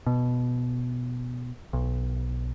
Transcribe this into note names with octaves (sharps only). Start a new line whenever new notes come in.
B2
B1